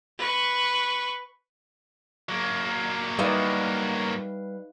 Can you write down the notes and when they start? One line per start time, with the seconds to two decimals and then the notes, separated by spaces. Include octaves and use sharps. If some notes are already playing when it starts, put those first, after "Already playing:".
0.19 B4 C#6
2.29 F#3 A#3
3.19 G3 D#4 E4 B4 D5 F5